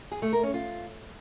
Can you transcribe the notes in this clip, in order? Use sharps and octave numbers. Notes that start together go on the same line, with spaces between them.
G#4
A3
A#4
C#4
F4